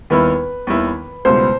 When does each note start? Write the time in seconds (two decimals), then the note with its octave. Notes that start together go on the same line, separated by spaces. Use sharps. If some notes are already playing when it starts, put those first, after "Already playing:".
0.10 D#2 D#3 G3 B3 E4 B4
0.67 D#2 D#3 G3 B3 E4
1.25 C#2 B2 G3 B3 E4 C5